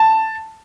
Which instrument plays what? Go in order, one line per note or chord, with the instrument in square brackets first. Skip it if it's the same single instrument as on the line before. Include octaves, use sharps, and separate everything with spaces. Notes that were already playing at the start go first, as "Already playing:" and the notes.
Already playing: [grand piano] A5